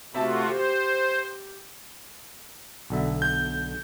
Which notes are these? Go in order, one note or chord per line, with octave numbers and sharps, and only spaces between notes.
C3 A3 F4 F#4 E5 A5
G4 C5
B1 D3 E5
G6